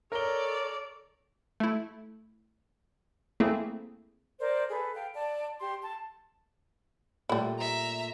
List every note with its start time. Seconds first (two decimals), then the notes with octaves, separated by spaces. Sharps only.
0.12 A4 A#4 C#5 D5 G7
1.60 A3 E4
3.40 A3 A#3 C4 E4 G#4
4.40 A#4 C5 D5
4.70 G#4 A4 B4
4.95 F5 G5
5.14 D5 A5
5.61 G4 C6
5.82 A5
7.29 A#2 G3 A3 E4
7.59 E5 A#5